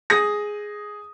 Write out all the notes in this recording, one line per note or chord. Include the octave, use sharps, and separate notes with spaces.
G#4 D#6 A#6